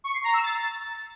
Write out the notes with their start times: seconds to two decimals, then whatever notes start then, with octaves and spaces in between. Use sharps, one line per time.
0.04 C#6
0.14 C7
0.24 A#5
0.34 E6
0.44 A6